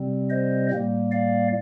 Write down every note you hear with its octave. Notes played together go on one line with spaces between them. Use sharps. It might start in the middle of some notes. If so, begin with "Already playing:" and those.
Already playing: C3 G3 C4
C5 D#5
A2 G3 A#3
D5 F5